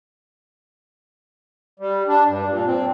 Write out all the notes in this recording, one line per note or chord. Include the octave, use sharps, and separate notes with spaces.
G3
D4
G2
A#2
C4